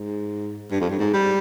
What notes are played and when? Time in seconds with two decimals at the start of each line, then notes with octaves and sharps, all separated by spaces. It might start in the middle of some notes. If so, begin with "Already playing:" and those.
Already playing: G#2
0.71 G2
0.81 F2
0.91 G2
0.99 G#2
1.14 G3